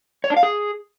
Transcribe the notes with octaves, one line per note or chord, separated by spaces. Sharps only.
C#5
D4
F5
G#4